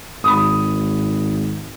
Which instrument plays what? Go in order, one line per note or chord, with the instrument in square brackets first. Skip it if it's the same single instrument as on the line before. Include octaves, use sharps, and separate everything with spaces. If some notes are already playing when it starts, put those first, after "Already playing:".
[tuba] G#1 [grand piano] B5 D#6